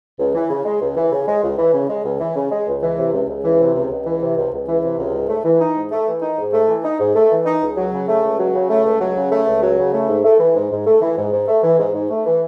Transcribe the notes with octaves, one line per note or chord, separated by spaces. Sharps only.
C#2
E3
C#3
G#3
C#2
E3
C#3
G#3
C#2
E3
C#3
G#3
C#2
E3
C#3
G#3
C#2
E3
C3
C#2
C#2
E3
C3
C#2
C#2
E3
C3
C#2
C#2
E3
C3
C#2
G#2
A3
E3
D#4
G#2
A3
E3
D#4
G#2
A3
E3
D#4
G#2
A3
E3
D#4
C#2
F#3
C#3
A3
C#2
F#3
C#3
A3
C#2
F#3
C#3
A3
C#2
F#3
C#3
A3
G#2
A3
E3
G#2
G#2
A3
E3
G#2
G#2
A3
E3
G#2
G#2
A3
E3